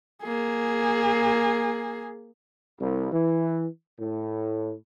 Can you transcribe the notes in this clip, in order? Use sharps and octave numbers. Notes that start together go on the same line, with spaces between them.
A#3 G#4
C2
E3
A2